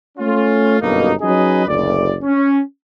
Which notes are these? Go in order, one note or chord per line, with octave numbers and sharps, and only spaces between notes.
A3 C#4 F4
G1 F#2 B2 A#3 D#4
F#3 C#4 D#4 G#4 B4 D#5
F#1 D2 D5
C#4